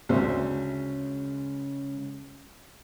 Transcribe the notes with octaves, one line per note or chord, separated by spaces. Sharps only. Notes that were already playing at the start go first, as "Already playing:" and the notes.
D2 C#3 G#3 C5 E5